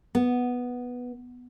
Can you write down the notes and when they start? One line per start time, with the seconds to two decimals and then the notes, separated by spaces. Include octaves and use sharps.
0.15 B3